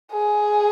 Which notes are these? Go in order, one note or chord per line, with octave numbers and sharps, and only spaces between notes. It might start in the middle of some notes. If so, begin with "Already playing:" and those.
G#4